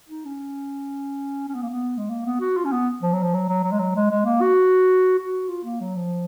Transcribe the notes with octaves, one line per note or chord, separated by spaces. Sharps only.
D#4
C#4
C#4
B3
A#3
B3
G#3
A#3
B3
F#4
F4
C#4
B3
F3
F#3
F3
F#3
F#3
F#3
G#3
F#3
G#3
G#3
A#3
F#4
F#4
F4
A#3
F#3
F3